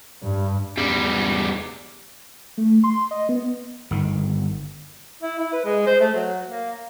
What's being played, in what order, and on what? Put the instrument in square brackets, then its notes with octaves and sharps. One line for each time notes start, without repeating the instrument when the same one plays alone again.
[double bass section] G2
[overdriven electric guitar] E2 G3
[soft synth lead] A3
C6
D#5
B3
[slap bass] G1 D#3
[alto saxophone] E4
E4
B4
G#3
C5
A3
F#3
A#3